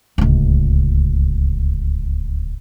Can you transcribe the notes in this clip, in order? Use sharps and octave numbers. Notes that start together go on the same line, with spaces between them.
D1 C#2